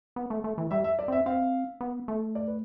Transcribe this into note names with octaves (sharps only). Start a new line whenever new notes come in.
B3
A3
A3
E3
G3 E5
E5
D5
C4 E5
C4 F5
B3
A3
D5
B4